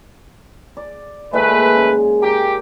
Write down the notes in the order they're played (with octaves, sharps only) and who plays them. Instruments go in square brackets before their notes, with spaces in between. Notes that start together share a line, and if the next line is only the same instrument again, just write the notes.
[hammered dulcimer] D5
[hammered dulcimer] A#2 D#3 G#3 [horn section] A3 B4
[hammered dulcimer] C#3
[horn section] G4 [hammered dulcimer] A#4